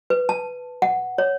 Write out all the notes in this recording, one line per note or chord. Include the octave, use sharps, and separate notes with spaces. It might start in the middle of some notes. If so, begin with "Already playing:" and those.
B4
A5
F#5
C#5